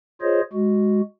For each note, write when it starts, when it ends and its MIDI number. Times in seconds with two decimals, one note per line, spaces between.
0.22 0.41 65
0.22 0.41 68
0.22 0.41 72
0.22 0.41 73
0.22 0.41 75
0.53 1.01 56
0.53 1.01 66